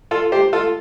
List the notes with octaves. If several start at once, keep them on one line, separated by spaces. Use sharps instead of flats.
F4 A4
G4 C5
F4 A4